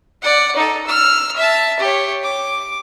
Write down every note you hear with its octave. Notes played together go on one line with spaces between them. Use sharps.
D5 F#5
D#4 A4
E6 F6
E5 A5
G4 C#5
D6